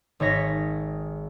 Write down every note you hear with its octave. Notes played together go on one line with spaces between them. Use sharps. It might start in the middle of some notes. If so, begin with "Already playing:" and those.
G#1 G#3 C#5 A#6 B6